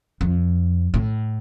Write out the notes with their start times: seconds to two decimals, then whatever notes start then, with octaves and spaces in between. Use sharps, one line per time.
0.21 F2
0.94 A2